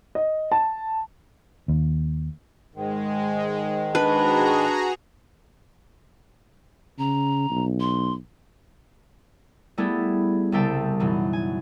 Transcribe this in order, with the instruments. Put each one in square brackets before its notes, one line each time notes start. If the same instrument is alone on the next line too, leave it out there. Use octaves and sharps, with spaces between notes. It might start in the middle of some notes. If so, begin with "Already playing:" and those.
[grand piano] D#5
A5
[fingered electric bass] D#2
[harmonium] G#2 D#3 [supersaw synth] G#3
[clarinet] D4 [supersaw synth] F#4 G#4 A#5 [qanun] B4
[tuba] C#3 [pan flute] A#5
[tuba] B1
[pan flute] C6
[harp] G3 A3 B3 E4 G#4 A4
C2 C#3 G3 E5 G5 A5
F#2 B2 E3 D#4
G#5